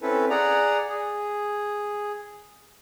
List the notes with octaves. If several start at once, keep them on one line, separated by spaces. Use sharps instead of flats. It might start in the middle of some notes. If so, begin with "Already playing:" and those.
C4 C#4 E4 A4 B4
G#4 D5 F#5 A#5
G#4